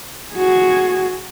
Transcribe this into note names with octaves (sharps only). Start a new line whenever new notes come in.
F#4 G#4